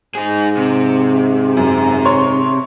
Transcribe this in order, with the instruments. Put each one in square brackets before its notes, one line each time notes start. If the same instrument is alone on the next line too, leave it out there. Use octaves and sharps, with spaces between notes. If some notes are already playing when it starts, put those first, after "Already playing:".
[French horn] G#2 [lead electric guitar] D#4 G#4
[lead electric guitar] C3
[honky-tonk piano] F#2
C#5 C6